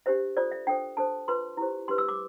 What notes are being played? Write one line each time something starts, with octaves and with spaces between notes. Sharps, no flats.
D4 G4 C5 E5
F4 A4 C5 D5
E5
D4 A4 C5 G5
D4 A4 C5 A5
F4 B4 C6
E4 G4 C5
D4 G4 B4 C6
E6
D6